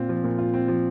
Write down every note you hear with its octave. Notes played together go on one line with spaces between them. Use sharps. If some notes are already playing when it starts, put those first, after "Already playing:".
Already playing: A#2 C4 F4
F3
A#2
F4
C4
F3